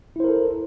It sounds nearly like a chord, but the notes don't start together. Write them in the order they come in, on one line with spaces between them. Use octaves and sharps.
E4 C5 A#4 A4